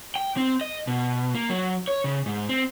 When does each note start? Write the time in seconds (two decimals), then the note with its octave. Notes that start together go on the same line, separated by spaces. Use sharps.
0.16 G5
0.37 C4
0.61 D#5
0.87 B2
1.35 A#3
1.49 F#3
1.88 C#5
2.04 C#3
2.26 G#2
2.49 C4